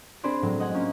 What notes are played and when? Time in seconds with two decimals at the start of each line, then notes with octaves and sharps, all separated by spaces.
0.23 C4 D4 G#4 B4 C5 D5
0.42 A2 F#3 G#3
0.59 D#5 F#5 G#5
0.74 A#3 C#4 F4